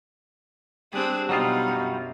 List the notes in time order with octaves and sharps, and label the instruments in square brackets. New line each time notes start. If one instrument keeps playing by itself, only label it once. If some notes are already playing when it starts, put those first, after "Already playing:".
[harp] G3 F#6 [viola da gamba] C4 D4 G#4
[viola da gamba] B2 D#4 [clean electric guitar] F#3 G3 F4 [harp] D5 D#5
[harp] F#2